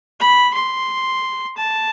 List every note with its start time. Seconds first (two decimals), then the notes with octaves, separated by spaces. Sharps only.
0.20 B5
0.54 C6
1.57 A5